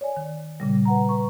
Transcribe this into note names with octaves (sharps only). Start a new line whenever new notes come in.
C#5 D5 G#5
D#3
A#2 C#3 G3
B4 F#5 A#5
B4 A#5 C#6